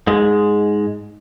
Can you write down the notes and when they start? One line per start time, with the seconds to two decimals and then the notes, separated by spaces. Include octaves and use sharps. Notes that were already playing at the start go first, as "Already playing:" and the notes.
0.07 G#2 G#3